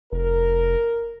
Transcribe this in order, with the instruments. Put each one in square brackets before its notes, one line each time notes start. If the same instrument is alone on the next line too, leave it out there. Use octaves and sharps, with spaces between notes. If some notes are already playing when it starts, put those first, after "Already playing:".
[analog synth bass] F1 [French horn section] A#4